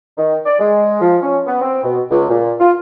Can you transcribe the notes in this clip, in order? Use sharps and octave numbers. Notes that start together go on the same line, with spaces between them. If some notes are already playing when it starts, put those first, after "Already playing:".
D#3
D5
G#3
F3
C#4
B3
C4
B2
C#2
A#2
F4